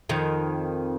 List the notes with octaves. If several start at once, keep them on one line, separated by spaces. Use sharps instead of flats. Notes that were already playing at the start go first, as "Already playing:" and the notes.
F2 D#3